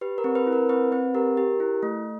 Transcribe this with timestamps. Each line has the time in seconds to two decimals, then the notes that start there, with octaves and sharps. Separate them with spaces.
0.01 G4 B4
0.18 A#4
0.24 C4
0.35 B4
0.47 E4
0.53 A#4
0.69 C4 B4
0.92 C4 B4
1.14 G4 A#4
1.37 G4
1.60 E4
1.83 A3